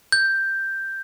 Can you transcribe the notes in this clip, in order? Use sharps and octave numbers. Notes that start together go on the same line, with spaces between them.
G6